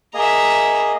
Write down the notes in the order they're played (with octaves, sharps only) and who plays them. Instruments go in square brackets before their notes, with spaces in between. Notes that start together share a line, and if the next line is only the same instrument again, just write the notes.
[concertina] A#3 G#4 D#5 [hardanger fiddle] E5 A#5